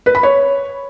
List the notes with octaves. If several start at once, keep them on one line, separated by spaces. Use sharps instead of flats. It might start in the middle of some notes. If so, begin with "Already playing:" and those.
B4
B5
C#5